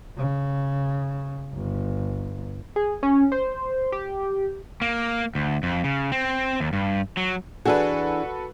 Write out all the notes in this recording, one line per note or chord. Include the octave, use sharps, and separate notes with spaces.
C#3
G1
G#4
C#4
C5
G4
A#3
D2
F2
C#3
C4
D#2
G2
F#3
E3 D4 F#4 G#4 A4 B4